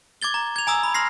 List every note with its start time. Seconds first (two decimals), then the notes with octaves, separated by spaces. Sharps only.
0.22 D6 G#6 A6 G7
0.34 A#5
0.56 G#6 F7
0.67 G#5 A#5 D#6 E6
0.83 B5
0.94 C6 F6 A#6 C7